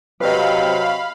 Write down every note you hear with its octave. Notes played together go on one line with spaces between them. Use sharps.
C3 F#3 C4 B4 D#5 F5 B5